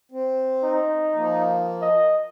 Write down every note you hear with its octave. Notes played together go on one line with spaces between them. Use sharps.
C4
D#4
F3 A#3
D#5